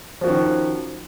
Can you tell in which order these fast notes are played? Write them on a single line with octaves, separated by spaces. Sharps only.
F3 F#4 C#4 D#3